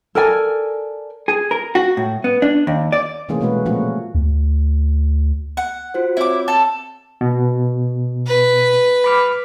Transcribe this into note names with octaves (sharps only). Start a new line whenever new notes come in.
A4 A#4 D5 G#5
G#4
A#4
F#4
A2
B3
D4
D#2
D5
C3 E3 A3 A#3 C#4 G#4
B2 G#3 A3 F#4 B4
A#2 F3 A3 A#3 C#4 F#4
D2
F#5
F4 F#4 C5
C4 E4 C#5 D6
A4 A5
B2
B4
B5 D6 F6